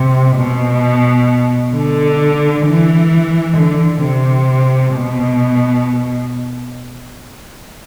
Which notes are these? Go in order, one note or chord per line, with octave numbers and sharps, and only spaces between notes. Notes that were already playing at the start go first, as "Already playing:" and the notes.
Already playing: C3
B2
D3
E3
D3
C3
B2